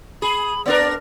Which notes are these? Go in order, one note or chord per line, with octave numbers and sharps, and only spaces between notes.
G#4 B5
B3 D4 A#4 D5